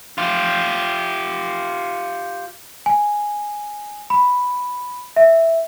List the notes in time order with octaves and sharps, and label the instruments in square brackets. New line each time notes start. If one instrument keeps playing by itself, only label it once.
[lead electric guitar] F4 G4
[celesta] G#5
B5
E5